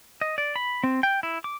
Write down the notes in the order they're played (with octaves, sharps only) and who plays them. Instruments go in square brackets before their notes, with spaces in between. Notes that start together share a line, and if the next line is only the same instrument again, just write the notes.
[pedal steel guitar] D#5
D5
B5
C4
G5
E4
D6